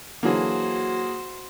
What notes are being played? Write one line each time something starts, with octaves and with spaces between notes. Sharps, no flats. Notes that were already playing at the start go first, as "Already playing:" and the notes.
D3 E3 F#3 A#3 F#4 G#4 C5